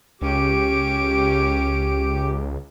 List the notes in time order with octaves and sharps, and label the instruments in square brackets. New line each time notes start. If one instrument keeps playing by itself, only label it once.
[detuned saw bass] C#2 [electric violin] C#4 D7 [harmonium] G4